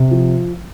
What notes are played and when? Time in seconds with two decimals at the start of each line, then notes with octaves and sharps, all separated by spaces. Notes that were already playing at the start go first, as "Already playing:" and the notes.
Already playing: C3
0.11 F3